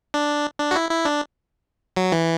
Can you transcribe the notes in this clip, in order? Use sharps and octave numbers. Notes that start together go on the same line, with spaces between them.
D4
D4
F#4
E4
E4
D4
F#3
E3